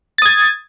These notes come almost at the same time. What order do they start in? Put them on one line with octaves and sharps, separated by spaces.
A6 D#6 G#6